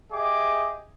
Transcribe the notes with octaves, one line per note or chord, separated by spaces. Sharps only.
G4 G#4 D#5 E5 D6